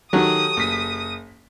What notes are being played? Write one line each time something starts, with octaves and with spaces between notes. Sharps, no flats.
D#3 F#3 G4 A4 D#6
F#1 B6